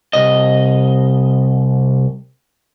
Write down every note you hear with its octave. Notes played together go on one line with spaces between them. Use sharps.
C2 D#5